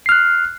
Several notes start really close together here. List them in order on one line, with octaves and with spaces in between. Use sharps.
C7 F6 F#6